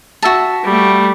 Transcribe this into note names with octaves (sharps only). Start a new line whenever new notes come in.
F#4 E5 A5
G3 A3